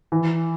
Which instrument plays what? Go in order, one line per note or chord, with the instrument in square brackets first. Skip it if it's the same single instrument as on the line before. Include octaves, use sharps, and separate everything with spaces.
[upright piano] E3